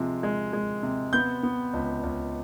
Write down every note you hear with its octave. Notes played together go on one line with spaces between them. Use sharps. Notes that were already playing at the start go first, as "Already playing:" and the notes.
Already playing: C3 F3 G#3
G#3
G#3
C3
B3 G6
B3
C#2
C#2